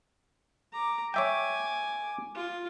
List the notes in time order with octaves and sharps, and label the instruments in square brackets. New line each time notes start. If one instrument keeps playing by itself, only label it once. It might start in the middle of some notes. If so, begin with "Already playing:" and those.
[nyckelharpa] A#5 D6
[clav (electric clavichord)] C#5 E5 G5 [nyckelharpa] G#5 D6
[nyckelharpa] F4